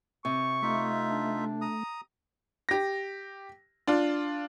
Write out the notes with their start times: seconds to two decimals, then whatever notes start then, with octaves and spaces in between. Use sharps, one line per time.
0.25 C3 C#6
0.62 A3 D#4 F4 E5
1.08 D4
1.61 A#5 D#6
2.69 G4 A#6
3.87 D4 F4